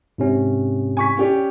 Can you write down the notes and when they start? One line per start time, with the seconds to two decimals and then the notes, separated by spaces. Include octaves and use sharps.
0.18 G#2 C3 C#4
0.97 G#5 C#6 B6
1.17 C#4 G4 D5